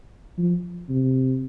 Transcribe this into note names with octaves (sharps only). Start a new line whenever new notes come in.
F3
C3